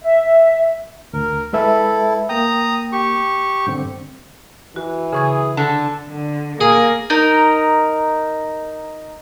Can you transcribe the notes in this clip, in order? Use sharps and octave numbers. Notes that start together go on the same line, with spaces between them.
E5
D2 A#4
G#3 E4 A4 B4 E5
A#3 G5 A#5 D#6
G4 C#6
G2 D3 C4
E3 F#4
C#3 G#4 C#6 G#6
D3 A5
D3
A#3 G#4
D#4 A#4